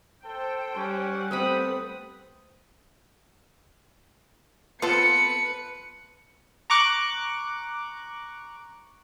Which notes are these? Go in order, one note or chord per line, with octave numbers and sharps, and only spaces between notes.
A4 C5 G5
G3 C#4 F#5
A3 B3 C4 B4 G5 B5 D#6
B3 C4 F4 A4 B4 C#7
A#5 C#6 D6 F#6